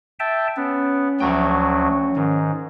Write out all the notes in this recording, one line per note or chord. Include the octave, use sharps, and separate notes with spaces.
E5 G5 A5
B3 C#4
D2 F3 F#3 E5 G5
G#2 D#3